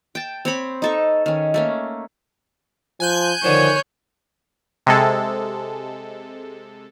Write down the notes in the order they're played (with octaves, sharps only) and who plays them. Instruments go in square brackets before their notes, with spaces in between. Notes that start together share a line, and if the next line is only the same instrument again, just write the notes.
[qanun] G5 A5
C4 C#5 B5
D#4 A4 C#6
D#3 C#4
A3 A#3 C#4
[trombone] F3 [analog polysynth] G#5 F#6 G6
[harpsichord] D3 F3 [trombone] D#3 [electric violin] C#5
[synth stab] C3 G#3 A4